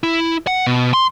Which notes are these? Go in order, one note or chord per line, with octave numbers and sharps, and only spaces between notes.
E4
F#5
B2
C6